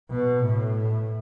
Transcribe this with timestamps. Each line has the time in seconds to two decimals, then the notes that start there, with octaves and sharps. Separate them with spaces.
0.11 B2
0.45 A2